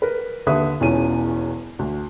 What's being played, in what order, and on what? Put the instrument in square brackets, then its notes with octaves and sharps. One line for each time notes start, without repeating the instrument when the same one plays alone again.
[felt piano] A#4 B4
D#2 D3 B4 E5 D#6
E1 E2 E3 C#4 F4 D#7
D2